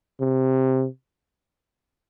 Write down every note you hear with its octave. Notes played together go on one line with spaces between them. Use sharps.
C3